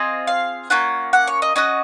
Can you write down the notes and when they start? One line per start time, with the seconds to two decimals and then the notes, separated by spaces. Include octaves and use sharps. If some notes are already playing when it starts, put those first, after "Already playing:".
Already playing: C4 F4 G#4 D#5
0.27 F5
0.70 A#3 C#4 F4 F#5
1.13 F#5
1.27 C#5
1.42 D#5
1.56 C#4 F#4 D#5